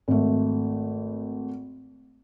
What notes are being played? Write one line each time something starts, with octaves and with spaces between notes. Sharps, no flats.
G#1 A3